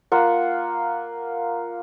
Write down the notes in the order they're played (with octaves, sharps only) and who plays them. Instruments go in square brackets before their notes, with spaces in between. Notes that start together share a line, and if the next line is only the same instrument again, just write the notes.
[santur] A#3 F4 F#5